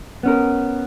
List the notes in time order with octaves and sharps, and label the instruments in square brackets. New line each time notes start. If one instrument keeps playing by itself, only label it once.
[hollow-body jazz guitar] B3 C#4 A#4